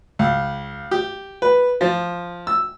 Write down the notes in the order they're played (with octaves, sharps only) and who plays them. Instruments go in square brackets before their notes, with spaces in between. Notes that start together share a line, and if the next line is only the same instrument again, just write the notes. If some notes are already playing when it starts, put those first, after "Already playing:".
[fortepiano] C#2
G4
B4
F3
E6